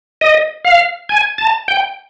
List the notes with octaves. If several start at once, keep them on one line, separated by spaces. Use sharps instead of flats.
D#5
F5
G#5
A5
G5